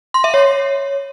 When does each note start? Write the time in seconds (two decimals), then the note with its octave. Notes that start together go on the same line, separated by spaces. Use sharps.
0.14 C6
0.24 E5
0.34 C#5